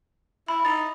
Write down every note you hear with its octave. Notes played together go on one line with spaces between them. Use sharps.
E4 B5
D#4 A6